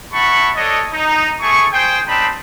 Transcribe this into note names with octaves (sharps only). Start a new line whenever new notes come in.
E4 F#5 A5 B5 C#6
D4 A4 C#5 D#5
D#4
A3 G#4 C#6
G#4 C5 G5
C4 D4 D#4 A5 B5